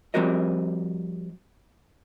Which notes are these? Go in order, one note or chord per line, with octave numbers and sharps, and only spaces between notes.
F3 G3 C4 F#4 A#4 D#5